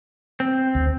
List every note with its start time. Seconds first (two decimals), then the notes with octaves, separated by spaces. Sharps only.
0.40 C4
0.75 D2